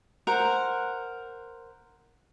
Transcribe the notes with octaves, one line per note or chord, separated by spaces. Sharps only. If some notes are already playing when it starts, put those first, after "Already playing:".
A#4 C5 F#5